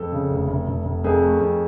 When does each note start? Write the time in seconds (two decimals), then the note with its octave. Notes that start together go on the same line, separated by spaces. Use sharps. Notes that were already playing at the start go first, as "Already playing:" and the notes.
Already playing: F2 A4
0.12 C#3
0.30 F1
0.48 F1
0.68 F1
0.85 F1
1.04 F2 G#4 A#4
1.23 A3
1.40 F2